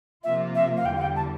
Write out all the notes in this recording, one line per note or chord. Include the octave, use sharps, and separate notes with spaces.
C3 F3 A#3 F4 E5
E5
F5
E2 D3 G3 G5
F5
G5
A5